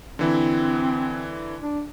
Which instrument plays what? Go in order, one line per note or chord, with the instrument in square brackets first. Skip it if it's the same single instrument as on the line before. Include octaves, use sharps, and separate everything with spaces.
[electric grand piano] D3 E3 E4 [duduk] C4
[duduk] D4